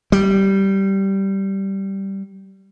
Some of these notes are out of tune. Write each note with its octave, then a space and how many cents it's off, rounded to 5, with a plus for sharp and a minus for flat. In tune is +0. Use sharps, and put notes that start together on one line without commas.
G3 -10